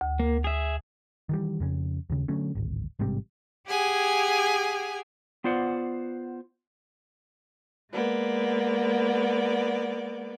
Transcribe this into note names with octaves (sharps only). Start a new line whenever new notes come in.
D2
A#3
G#4 E5
D#3 E3 G3
F2 C#3 C#4
D#2 C#3
D3 F#3 A3 C#4
D1 G#1
A1 G#2 C3 G3
G4 G#4 F#5 G#5
B3 F4 C5 D5 F#5
G#3 A#3 B3 D5